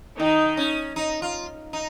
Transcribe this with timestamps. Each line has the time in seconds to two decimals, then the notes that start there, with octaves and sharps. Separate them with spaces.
0.19 D#3 D#4
0.57 C#4
0.96 D#4
1.22 F4
1.73 D#4